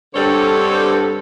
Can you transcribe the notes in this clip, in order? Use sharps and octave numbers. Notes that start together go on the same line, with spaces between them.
G2 D3 G3 C4 A4 C#5